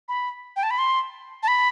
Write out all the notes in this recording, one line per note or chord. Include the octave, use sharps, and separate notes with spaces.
B5
G5
A5
B5
C6
A5
B5